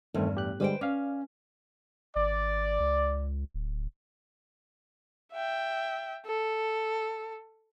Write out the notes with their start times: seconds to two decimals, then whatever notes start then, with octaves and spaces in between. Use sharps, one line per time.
0.14 E2 G2 D#3 A3 C4
0.35 A2 G4 F#6
0.60 D3 G3 G#3 B4 C5 G5
0.81 C#4 D5 F5
2.16 G#1 D5
2.80 C#2
3.54 D1
5.32 E5 G5
6.26 A4